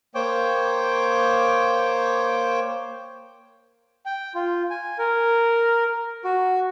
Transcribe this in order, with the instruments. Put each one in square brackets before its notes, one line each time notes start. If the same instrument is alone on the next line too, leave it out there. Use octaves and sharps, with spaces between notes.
[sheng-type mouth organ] A#3 C5 C#5 G5 D6
G5
F4
G#5
A#4
F#4